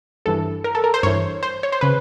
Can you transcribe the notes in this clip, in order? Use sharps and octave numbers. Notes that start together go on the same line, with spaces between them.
G2 E3 A4
A#4
A4
A#4
C5
G2 E3 C#5
C5
C#5
C5
C#3 B4